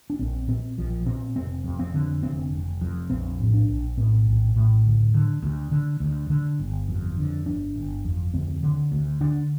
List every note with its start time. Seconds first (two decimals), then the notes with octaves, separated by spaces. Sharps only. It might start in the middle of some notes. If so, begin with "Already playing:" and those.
0.10 D4
0.19 A#1 C4
0.48 A#2 C4
0.78 A#1 F3
1.06 A#2 C4
1.36 F1 C4
1.64 F2
1.79 C4
1.94 D3
2.23 F1 C4
2.52 F1
2.81 F2
3.09 A#1 C4
3.40 A2
3.53 D4
3.68 A#1
3.97 A2 C4
4.26 A#1
4.55 A2
4.85 D2
5.14 D3
5.43 D2
5.71 D3
6.00 D2
6.30 D3
6.59 G1
6.89 F2
7.17 D3
7.46 G1 D4
7.76 G1
8.05 F2
8.33 D2 C4
8.63 D3
8.92 D2
9.20 D3 D4